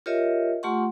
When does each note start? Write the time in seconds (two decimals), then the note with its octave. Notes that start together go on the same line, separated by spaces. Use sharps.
0.06 F4 G4 A#4 C#5 D#5 E5
0.63 A3 F4 G4 F#5 C6 C#6